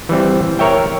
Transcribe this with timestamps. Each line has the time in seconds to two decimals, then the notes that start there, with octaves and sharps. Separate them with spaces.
0.09 E3 G3 C4
0.59 A#4 C#5 E5 G5